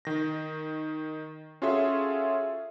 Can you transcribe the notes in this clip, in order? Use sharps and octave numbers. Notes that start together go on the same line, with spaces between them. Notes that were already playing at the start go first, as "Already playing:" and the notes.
D#3 A#6
C#4 F4 F#4 G#4 A4 E5